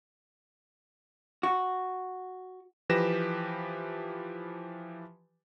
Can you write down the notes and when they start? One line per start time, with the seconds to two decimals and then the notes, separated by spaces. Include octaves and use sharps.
1.43 F#4
2.89 E3 F3 G4 B4 A#6 E7